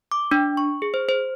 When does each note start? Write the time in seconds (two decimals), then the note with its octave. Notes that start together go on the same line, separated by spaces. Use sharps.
0.12 D6
0.31 D4
0.57 C#6
0.82 G#4
0.94 C5
1.09 C5